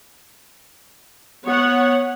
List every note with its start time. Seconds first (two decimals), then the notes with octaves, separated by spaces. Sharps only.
1.45 B3 C#5 F#5